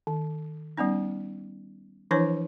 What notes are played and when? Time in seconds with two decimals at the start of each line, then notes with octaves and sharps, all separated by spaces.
0.07 D#3
0.77 G3 B3 C#4 D#4
2.11 E3 F3 D4 E4 C5 C#5